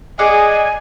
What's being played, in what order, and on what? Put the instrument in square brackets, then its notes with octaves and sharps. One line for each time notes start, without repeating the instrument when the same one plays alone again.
[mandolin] G#4 D5 F#5 [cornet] D#5 [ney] G#5